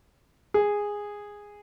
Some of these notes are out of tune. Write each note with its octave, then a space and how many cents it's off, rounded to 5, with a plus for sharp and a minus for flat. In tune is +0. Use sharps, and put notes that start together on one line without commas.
G#4 -10